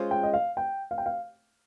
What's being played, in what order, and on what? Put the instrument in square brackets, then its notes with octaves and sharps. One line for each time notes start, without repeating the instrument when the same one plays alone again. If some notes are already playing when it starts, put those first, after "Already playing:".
Already playing: [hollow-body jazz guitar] G#3 C#4 F4 C5
[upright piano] G5
D#5
F5
G5
F5
G5
F5